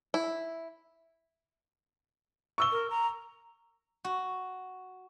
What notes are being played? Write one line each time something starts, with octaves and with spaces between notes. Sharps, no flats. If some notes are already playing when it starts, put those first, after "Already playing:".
E4
C#6 E6 G7
A#4
A#5
F#4